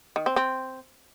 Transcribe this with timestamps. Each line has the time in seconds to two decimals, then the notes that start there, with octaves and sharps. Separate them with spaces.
0.16 D#3
0.26 C4
0.36 C4